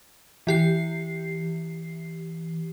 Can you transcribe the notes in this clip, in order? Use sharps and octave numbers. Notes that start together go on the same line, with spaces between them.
E3 G4 C7